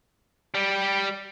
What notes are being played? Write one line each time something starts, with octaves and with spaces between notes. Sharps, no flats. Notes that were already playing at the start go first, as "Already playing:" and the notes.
G3 G4